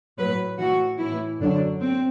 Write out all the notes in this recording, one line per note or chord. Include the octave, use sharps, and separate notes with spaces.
A2 F#3 B4
A2 E3 F#4
A2 E3 E4
F#2 D3 F#3 D4
C4